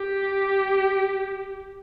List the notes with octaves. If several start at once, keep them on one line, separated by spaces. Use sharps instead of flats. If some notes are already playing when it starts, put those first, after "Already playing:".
Already playing: G4